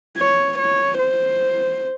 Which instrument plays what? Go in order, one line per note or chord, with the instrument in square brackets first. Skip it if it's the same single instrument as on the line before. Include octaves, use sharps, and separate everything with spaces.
[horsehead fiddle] C#5
C#5
C5